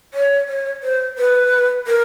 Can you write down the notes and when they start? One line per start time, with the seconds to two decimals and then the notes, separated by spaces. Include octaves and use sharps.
0.14 C#5
0.48 C#5
0.83 C5
1.18 B4
1.87 A#4